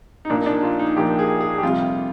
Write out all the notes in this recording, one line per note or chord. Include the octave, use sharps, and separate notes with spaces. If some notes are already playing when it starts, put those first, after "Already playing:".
D#4
A#1 A#2 F3 D4
D#4
D4
F4
D#4
A#1 A#2 F3 G4
G#4
G#4
G4
F2 C3 G3 F4